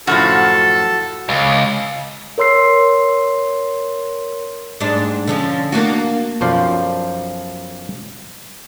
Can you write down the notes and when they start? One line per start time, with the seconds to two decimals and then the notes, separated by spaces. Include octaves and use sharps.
0.07 F#2 A2 F3 F#4 A4
1.29 C#2
2.38 A#4 C#5 C6 E6 C7
4.81 G#2 G3 D4
5.27 D3 F3 C#4
5.72 A#3 D4 F#4
6.41 B1 F#2 F3 C5 D5 F5